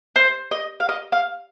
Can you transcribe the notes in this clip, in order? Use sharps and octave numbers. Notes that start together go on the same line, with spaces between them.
C5
D#5
F5
D#5
F5